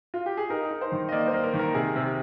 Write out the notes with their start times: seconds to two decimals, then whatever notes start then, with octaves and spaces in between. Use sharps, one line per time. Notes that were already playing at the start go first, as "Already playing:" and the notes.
0.14 F4
0.26 G4
0.37 G#4
0.50 D#4 A#4
0.71 D#4
0.81 C5
0.92 D#3
1.09 D#5
1.12 A#3 D5
1.28 C5
1.33 A#3
1.44 A#4
1.53 D#3
1.59 A#4
1.74 C3 G#4
1.96 C3